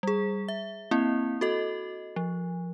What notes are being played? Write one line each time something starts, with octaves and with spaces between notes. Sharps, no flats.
G3 G#4
E5
A#3 C4 E4
F#4 A4 D#5
F3